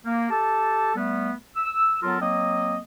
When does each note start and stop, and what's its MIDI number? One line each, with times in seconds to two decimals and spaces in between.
0.05 0.29 58
0.30 0.94 67
0.30 0.94 69
0.30 0.94 81
0.96 1.32 55
0.96 1.32 57
0.96 1.32 59
1.56 1.97 88
2.03 2.18 54
2.03 2.18 59
2.03 2.18 65
2.03 2.18 69
2.03 2.18 70
2.19 2.77 54
2.19 2.77 58
2.19 2.77 60
2.19 2.77 75